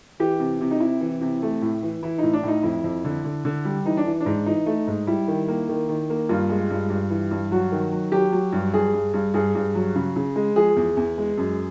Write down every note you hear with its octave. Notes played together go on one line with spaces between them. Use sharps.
E3 G4
C3
C3
D#4
C3 E4
E3
C3
A3
A2
E3
E3 E4
A2 D#4
D4
A2 D#4
F2 E4
F2
D3
D3
D3
G3
E3 D#4
D4
E3
D4
G#2
E3 D#4
A3
G#2
G3 E4
D#3
A#3
D#3
D#3
A#3
G2 F4
G#3
G2
G2
E3
G2
F#3 F#4
D#3
F#3
F#3 G4
F#3
G2
G2 G#4
G2
G2
G2 G#4
G2
F#3
C#3
C#3
G#3
F3 G#4
E2
E2
G#3
F#2